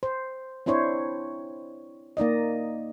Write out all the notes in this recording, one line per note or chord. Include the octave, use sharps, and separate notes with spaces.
C5
C4 D4 E4 C5 C#5
A#3 D#4 D5 D#5